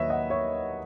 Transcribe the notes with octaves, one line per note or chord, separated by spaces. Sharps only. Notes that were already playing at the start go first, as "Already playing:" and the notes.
Already playing: D#2 D#3 F#3 B4 C#5 D#5 E5
D#5 F#5
C#5 E5